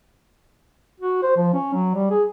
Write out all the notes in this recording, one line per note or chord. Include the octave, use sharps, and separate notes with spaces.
F#4
C5
F3
C#4
F#3
G3
G#4